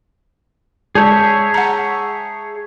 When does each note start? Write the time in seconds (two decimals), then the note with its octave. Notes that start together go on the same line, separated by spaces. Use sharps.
0.95 G#3 G#4 C#5 E5 A5 G6
1.54 F#5 A#5